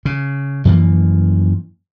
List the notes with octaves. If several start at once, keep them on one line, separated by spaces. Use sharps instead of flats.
C#3
F#2 E3 F3 A#3